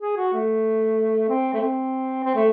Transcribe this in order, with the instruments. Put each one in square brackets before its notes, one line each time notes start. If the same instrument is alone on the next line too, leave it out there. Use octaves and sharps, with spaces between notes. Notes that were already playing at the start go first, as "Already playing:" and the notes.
[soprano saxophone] G#4
F#4
A3
C4
A3
C4
C4
A3